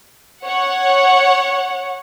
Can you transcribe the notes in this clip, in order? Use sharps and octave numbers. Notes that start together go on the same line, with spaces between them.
C#5 F#5